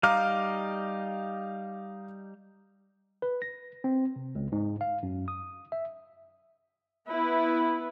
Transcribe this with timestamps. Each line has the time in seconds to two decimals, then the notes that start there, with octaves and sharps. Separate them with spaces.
0.03 G3 D#4 F5 A#5 D6 F6
3.22 B4
3.42 A#6
3.84 C4
4.16 C3
4.35 C#2
4.52 G#2
4.81 F5
5.03 F#2
5.28 D#6
5.72 E5
7.09 B3 E4 B4